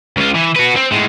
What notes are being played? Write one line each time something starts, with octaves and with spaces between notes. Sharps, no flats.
C#2 F4
E3
F#4 B4
C4
A2 G#3